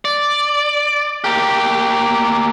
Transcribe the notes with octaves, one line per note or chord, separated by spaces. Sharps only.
D5
A#3 G4